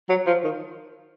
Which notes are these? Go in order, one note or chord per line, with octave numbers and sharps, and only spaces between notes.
F#3
F3
D#3